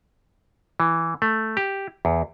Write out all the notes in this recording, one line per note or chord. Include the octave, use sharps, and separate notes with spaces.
E3
A3
G4
E2